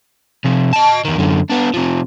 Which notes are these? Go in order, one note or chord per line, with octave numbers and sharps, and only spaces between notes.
C3 F3
D#5 A5
E2 D#3
F#2 D3
B3 D4
C3 F3